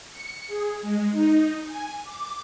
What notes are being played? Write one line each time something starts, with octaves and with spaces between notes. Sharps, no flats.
C#7
G#4
G#3
D#4
G#5
D6